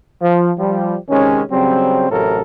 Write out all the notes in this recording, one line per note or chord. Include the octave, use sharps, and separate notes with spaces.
F3
F3 G3
C3 D#3 G#3 C#4
C#3 F#3 G3 C4
A1 A2 C3 F#3 A4 A#4